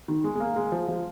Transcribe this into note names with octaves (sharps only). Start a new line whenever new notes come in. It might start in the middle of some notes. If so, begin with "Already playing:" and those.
D#3
G#3
G#3
A#3
G#3
F3
F3